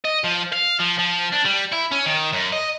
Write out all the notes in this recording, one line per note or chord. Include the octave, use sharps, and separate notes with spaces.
D#5
F3
F5
F3
F3
D4
G3
E4
C#4
D#3
F#2
D#5